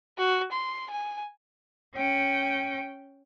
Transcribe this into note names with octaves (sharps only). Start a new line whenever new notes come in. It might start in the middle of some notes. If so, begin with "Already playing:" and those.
F#4
C6
G#5
C#4 G5